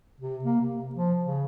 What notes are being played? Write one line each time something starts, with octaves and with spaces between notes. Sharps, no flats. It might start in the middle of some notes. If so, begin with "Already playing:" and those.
C3
A#3
C3
F3
C#3